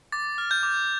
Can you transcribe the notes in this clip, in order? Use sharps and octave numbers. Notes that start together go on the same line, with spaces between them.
D6 A6
F6
G6
D6